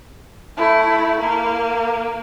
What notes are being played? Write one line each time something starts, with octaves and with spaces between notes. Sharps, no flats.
A3 E4
A#3